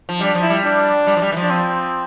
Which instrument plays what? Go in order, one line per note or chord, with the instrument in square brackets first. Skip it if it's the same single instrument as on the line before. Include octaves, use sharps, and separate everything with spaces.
[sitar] F3
[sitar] G3 [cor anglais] D4
[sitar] F3
[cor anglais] E4
[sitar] G3
[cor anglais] D4
[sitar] G3
F3
G3
E3
F3
[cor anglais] D4
C4